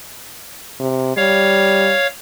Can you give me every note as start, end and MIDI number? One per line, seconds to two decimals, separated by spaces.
0.80 1.14 48
1.17 1.93 55
1.17 2.07 73
1.17 2.07 77